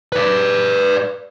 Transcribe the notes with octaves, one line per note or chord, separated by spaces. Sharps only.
B4 D5